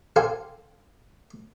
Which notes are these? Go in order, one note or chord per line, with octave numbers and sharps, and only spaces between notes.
G4 A4 C5 F5 G5 G#5